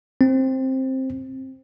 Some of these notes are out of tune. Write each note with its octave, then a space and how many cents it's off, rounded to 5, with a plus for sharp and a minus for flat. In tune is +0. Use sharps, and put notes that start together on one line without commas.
C4 +10